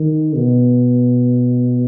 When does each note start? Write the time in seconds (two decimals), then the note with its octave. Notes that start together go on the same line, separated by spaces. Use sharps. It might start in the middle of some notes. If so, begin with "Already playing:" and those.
Already playing: D#3
0.35 B2